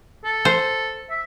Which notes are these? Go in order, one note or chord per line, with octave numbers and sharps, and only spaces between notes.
A4
C5
E5